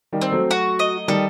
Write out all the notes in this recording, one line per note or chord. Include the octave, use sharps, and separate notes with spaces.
D#3 G3
C4
F#3 A3
F#4
D#5
D#3 G3 A4